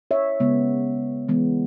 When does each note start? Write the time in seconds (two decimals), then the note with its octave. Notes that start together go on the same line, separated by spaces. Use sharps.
0.11 C#5 E5
0.40 C#3 G#3 B3
1.29 E3 G#3 B3